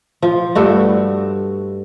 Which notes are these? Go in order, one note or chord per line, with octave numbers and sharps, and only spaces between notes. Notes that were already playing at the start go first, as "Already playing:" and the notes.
F3
G2 A3 F#4